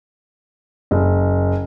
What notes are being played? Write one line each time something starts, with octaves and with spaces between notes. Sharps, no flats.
F#1